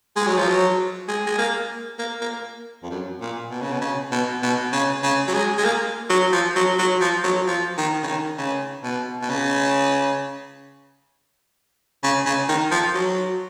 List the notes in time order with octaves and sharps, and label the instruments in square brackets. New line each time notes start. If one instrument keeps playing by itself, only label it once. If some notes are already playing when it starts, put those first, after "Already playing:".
[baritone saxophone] G#3
F#3
F3
F#3
G#3
G#3
A#3
A#3
A#3
F2
F#2
A#2
B2
C#3
B2
C#3
B2
B2
C#3
C#3
F#3
G#3
G#3
A#3
F#3
F3
F#3
F#3
F3
F#3
F3
D#3
C#3
D#3
C#3
B2
B2
C#3
C#3
C#3
D#3
F3
F#3